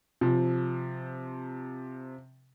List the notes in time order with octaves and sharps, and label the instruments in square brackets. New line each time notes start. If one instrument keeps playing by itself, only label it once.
[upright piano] C3 F3